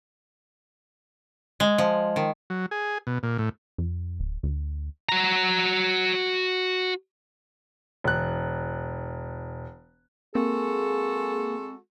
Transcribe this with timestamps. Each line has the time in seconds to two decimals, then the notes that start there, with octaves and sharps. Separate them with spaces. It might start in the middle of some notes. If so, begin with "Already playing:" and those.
1.60 G#3
1.78 F3
2.16 D#3
2.50 F#3
2.71 G#4
3.07 B2
3.23 A#2
3.38 A2
3.78 F2
4.19 D1
4.43 D2
5.09 F#4 A#5
8.04 E1 F#6
10.35 G#3 A#3 C4 F#4 G#4 A4